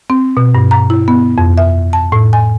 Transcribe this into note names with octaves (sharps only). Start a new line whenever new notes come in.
C4
B2
G2
A#5
E4
B3
F2
E5
A5
A2
G#5